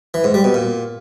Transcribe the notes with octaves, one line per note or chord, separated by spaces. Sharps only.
E3
G#2
G3
B2
A#2